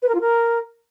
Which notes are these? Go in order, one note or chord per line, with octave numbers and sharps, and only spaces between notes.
B4
A#4
F4
A#4